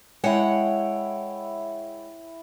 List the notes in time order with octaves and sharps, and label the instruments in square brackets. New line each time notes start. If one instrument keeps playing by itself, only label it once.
[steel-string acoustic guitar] G#3 C#5 F#5 [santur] E4 G5